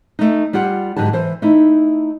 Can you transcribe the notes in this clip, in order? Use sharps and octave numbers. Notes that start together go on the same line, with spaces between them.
A3 D#4
G3 F4 G4 F#5
G#2 D3 F#3 G4 A5
E3 C5
A3 D#4 E4